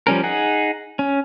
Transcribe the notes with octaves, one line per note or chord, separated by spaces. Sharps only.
F3 G3 C#4 A#4
D#4 G#4 F#5
C#4